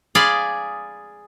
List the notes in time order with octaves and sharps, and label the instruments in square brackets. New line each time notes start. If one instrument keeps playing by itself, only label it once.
[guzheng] G#4 D5 F5 B5 C6